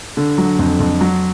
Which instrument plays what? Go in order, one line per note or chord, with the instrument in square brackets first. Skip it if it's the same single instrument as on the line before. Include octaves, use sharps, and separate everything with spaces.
[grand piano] D3
F#3
F2
F2
F#3